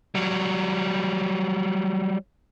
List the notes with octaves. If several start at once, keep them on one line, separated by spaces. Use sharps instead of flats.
F#3 G3